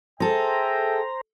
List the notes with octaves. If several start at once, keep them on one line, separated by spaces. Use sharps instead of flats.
G#4 A4 C5 E5 G5 A#5